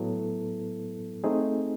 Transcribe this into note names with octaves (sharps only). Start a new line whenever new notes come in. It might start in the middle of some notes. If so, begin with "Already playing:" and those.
Already playing: A2 F#3 B3 E4 A4
A3 C4 D#4 G#4